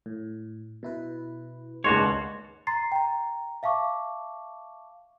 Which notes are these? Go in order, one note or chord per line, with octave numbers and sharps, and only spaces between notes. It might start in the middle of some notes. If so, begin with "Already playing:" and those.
A2
B2 E4 B4
C#2 D#3 G#3 A#3 D4 F#4 C#5 C6
A#5 C6 A6 C7
G5 A#5
E5 F5 A5 C#6 D6